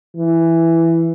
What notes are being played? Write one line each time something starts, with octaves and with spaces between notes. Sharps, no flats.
E3